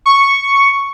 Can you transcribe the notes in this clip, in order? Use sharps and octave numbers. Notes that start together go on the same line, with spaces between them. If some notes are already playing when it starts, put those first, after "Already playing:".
C#6